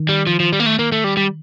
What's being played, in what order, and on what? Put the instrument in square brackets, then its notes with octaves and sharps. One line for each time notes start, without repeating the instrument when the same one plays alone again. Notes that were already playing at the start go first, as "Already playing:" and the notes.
Already playing: [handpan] D#3
[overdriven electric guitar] G3
F3
F3
G3
A#3
A3
A#3
A3
G3
G3